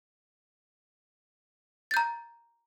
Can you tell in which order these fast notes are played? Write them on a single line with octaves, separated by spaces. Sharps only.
A6 G6 A#5